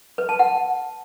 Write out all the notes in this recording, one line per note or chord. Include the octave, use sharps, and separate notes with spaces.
B4
A5
F#5